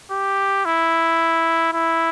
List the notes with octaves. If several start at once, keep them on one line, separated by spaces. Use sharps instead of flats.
G4
E4
E4